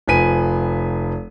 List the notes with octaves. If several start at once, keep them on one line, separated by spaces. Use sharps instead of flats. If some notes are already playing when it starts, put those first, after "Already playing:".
F1 F3 B4 G#5 B6 D#7